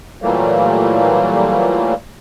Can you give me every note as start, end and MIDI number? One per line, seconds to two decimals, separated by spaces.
0.22 1.94 46
0.22 1.94 52
0.22 1.94 54
0.22 1.94 55
0.22 1.94 57
0.22 1.94 58